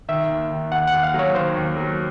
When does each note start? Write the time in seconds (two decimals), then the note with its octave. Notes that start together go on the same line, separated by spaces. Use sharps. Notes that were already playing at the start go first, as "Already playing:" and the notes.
0.09 D#3 E5
0.29 D#2
0.51 D#3
0.71 D#2 F#5
0.88 F#5
0.93 D#2
1.03 F5
1.14 F#3 C#5
1.35 D#3 C5
1.56 D#2
1.77 F#3